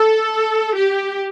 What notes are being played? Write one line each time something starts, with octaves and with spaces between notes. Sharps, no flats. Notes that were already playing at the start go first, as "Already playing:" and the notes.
Already playing: A4
G4